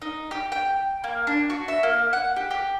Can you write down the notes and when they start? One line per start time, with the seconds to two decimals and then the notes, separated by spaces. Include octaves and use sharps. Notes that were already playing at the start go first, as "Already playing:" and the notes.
0.02 D#4
0.31 G4
0.52 G5
1.04 A#3
1.27 D4
1.50 F#4
1.68 E5
1.83 A#3
2.13 F#5
2.36 G4
2.51 G4